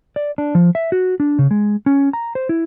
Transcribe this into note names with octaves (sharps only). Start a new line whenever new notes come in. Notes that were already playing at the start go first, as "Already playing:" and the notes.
D5
D4
F3
E5
F#4
D4
C#3
G#3
C#4
A#5
C5
E4